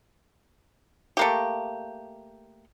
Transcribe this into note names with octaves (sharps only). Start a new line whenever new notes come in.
A3 A#3 G4